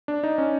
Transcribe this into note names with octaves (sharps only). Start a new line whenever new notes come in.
D4
D#4
C#4